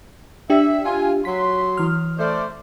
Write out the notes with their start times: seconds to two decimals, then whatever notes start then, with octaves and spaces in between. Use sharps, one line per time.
0.50 D4 G4 E5
0.85 F4 G#5
1.25 F#3 C6 B6
1.77 E3 F6
2.19 A3 C5 D5